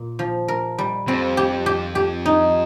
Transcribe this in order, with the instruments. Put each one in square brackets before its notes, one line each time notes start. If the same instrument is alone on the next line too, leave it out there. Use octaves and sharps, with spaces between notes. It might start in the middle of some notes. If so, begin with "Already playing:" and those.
Already playing: [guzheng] A#2
F3
A#4
G3
[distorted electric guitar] F2 [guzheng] C4
[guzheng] G4
G4
G4
D#4